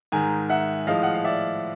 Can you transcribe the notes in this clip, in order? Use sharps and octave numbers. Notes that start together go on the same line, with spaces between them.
G#2 D#3 G#3 G#5 A#5
E5 F#5
A2 F3 G#3 D#5 F5
F#5
F5
D5 E5